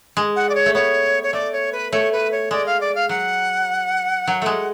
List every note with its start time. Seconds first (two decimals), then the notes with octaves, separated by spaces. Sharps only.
0.17 G#3
0.36 F#5
0.49 D5
0.55 C#5
0.66 A3
0.75 B3 C#5
1.23 C#5
1.33 A3 D5
1.53 C#5
1.73 B4
1.92 A3 C#5
2.12 B4
2.32 C#5
2.51 G#3 D5
2.66 F5
2.81 D5
2.95 F5
3.09 F#3 F#5
4.27 F#3
4.42 G#3 A3